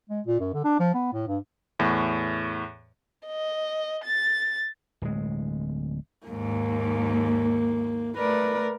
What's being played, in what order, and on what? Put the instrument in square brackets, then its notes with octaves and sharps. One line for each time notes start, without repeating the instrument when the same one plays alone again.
[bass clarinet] G#3
A#2
F#2
D3
D4
F3
B3
A2
G2
[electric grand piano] E2 A2
[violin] D#5
A6
[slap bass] D1 G#3
[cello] D#2 G#2 [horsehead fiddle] A#3
[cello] A3 A#4 [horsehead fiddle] B4 D5